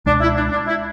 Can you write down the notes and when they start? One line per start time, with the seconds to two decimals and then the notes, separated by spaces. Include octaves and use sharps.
0.06 C#2 B2 G#3 D4
0.20 E4
0.36 D4
0.52 D4
0.67 E4